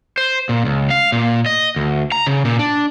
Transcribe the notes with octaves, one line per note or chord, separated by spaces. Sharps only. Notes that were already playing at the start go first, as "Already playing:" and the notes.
C5
A#2
C#2
F5
A#2
D#5
D2
A#5
C#3
A#2
D4